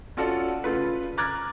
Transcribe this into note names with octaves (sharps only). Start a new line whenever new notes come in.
C#4 F4 F#4 A4 D5
C#3 A3 F4 B4
A#5 D6 F6 F#6 G#6 A6